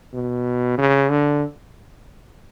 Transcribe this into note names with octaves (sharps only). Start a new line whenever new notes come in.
B2
C#3
D3